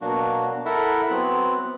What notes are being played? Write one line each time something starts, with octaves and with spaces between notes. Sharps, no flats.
B2 F#3 A#3 D4 F#4
E4 A4 A#4 E5 F#5 B5
F#3 B3 C4 F#6